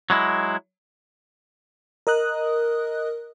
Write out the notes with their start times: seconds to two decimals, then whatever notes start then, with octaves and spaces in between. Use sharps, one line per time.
0.10 F#3 G#3 E4
2.07 A#4 D#5 D#6 F#6